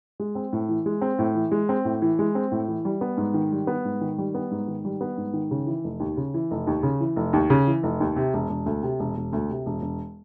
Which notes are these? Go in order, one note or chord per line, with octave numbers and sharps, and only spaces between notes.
G#3
C4
A2
E3
G#3
C4
A2
E3
G#3
C4
A2
E3
G#3
C4
A2
E3
G3
B3
G#2
D#3
G3
B3
G#2
D#3
G3
B3
G#2
D#3
G3
B3
G#2
D#3
C#3
E3
F1
D#2
C#3
E3
F1
D#2
C#3
E3
F1
D#2
C#3
E3
F1
D#2
C3
E1
E1
D2
C3
E1
E1
D2
C3
E1
E1